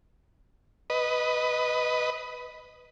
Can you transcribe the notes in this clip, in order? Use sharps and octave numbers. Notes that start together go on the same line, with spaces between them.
B4 D#5